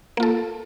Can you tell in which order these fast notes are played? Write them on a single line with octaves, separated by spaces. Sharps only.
A#3 F4 A4